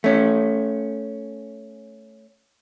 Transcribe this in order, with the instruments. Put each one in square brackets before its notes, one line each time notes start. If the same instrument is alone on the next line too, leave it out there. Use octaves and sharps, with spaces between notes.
[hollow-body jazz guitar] A3 C#4